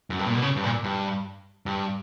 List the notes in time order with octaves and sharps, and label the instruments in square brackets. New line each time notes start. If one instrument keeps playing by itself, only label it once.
[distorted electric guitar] F#2
G2
A#2
B2
C#3
G2
A#2
G2
G2